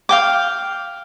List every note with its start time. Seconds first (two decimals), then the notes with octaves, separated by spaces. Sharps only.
0.09 F5 G5 D6